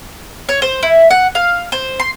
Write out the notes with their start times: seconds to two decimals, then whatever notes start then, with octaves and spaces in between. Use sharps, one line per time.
0.49 C#5
0.62 C5
0.83 E4
1.11 F#5
1.35 F5
1.72 C5
2.00 C6